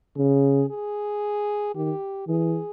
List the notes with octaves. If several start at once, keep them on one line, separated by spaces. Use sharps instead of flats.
C#3 G#4
G#4
D#3 G4
E3 G#4